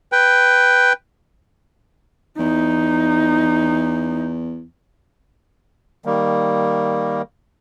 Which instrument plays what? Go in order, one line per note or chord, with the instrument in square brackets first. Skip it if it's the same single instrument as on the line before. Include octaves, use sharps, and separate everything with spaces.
[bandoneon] B4 G5
[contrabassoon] E2 [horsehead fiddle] D#4
[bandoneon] D#3 G3 A#3